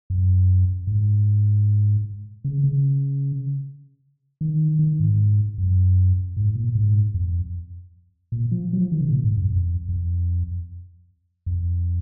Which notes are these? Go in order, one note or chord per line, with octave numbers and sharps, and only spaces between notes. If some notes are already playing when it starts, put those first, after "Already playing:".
F#2
G#2
C#3
C#3
D#3
D#3
G#2
F#2
G#2
A#2
G#2
F2
A#2
F3
F#3
F3
D#3
C#3
A#2
G#2
F#2
F2
F2
F2